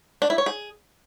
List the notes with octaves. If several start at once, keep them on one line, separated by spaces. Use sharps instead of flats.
D4
E4
C#5
G#4